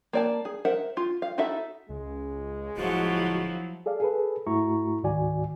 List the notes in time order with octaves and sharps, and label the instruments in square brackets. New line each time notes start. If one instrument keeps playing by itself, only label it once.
[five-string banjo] A#3 D5 A5
G#4
A#4 C5 E5 F#5
F4
F5
D#4 E4 F#4 A4 E5
[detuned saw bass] C#2 [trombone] G#3
[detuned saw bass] D1 [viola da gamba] F3 F#3 E4 [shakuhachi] F#4
[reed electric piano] G#4 A4 D5 F5
G#4 A4 B4
G#2 A3 E4 F#4 A#5 C#6
C#2 G#2 D#3 F#4 D5 G#5